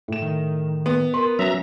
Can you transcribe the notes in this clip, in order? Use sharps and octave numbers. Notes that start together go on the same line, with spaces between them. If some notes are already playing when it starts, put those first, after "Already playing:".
A2 E7
D#3
B3
A#4 B4 C6
F#3 C#4 E5 A#5